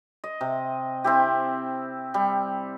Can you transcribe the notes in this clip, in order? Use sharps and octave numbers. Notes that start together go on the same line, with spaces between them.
D#5
C3
C4 E4 G4
G3